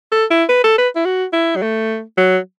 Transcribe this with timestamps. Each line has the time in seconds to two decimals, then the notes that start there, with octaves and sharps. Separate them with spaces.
0.12 A4
0.31 E4
0.49 B4
0.64 A4
0.78 B4
0.96 E4
1.05 F#4
1.33 E4
1.56 F#3
1.62 A3
2.18 F#3